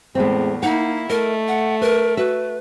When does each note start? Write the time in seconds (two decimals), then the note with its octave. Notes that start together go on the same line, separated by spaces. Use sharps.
0.15 E2 A2 G#3 C4
0.63 A#3 D#4 E4 F#5
1.10 A3 A#4 D#5
1.48 F#5
1.81 A#4 B4
2.17 F#4 B4 E5